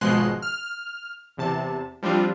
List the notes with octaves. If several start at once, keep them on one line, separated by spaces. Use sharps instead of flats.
G#1 B2 F3 G#3 C6 F#6
F6
E2 C3 A5
F3 G3 C4 D4 F4